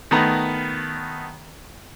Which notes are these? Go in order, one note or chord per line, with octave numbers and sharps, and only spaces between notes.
D#3 A3 B3 A#5 B5